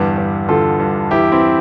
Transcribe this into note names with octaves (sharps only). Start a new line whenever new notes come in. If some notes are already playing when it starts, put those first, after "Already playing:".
Already playing: E2 G2 D3 G3 B3
G2
D3 F4 A4
G2
E2 E4 G4
C4 E4